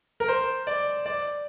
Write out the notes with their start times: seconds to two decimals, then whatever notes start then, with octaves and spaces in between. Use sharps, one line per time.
0.20 A#4
0.28 C5
0.67 D5
1.06 D5